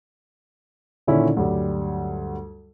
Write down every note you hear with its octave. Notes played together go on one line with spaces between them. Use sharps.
A#2 D3 D#3 C#4 E4
D2 G2 F#3 G3